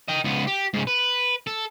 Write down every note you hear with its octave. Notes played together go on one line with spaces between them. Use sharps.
D#5 G5
C#2 B3
G4
G#2 C#3
B4
A4